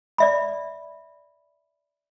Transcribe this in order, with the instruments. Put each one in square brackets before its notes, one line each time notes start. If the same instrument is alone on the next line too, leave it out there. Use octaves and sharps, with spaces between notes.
[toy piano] D5 E5 B5